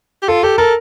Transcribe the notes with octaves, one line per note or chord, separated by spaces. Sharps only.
G4
F4 A4
G4 A4
A4 A#4